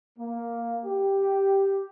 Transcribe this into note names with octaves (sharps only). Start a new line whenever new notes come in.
A#3
G4